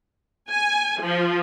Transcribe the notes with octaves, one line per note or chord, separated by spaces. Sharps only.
G#5
F3